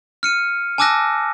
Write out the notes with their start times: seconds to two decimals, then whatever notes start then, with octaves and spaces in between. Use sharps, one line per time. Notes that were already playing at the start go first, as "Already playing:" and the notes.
0.23 F6 C#7 D#7
0.78 G#5 A5 D6 E6 F#6 A#6